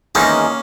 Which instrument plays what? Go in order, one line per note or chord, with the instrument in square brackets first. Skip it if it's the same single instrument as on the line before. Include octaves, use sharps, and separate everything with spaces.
[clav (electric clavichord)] E2 D#3 G#3 D#4 [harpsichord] A#3 C#4